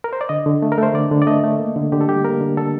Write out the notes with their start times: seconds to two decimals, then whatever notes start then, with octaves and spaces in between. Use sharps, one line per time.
0.04 A#4
0.13 C5
0.21 D5
0.29 D3 D#5
0.46 D3
0.62 A3
0.72 A#4
0.78 A3
0.83 C5
0.94 D3 D5
1.11 D3
1.22 D5
1.27 A3 D#5
1.44 A3
1.59 A#3
1.76 D3
1.92 D3 G4
2.01 A4
2.09 G3 G4
2.25 A#3 A#4
2.41 D3
2.57 D3 A4